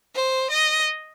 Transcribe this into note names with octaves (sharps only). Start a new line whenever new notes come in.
C5
D#5